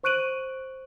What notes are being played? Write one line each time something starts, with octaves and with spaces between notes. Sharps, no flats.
C5 C#6 F#6 D7 D#7 F#7